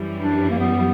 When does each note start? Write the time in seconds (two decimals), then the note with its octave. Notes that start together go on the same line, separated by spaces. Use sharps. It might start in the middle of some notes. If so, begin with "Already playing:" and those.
Already playing: F#2 E3 G3
0.19 D4
0.50 A#3
0.59 B3